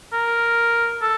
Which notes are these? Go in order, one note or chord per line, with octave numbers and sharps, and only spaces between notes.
A#4
A4